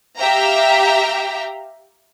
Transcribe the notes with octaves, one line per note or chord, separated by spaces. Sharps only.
G4 E5 F5 G5 A#5